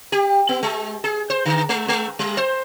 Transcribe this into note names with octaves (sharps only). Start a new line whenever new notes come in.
G4
B3
G#3
G#4
C5
D3
G#3
G#3
G3
C5